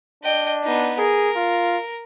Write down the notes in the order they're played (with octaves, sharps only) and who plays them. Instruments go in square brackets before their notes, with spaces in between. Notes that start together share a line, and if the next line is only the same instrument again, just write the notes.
[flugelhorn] D4 [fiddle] D#5 G5
[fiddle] B3 D#4
[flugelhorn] G#4 [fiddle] A#4
[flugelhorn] F4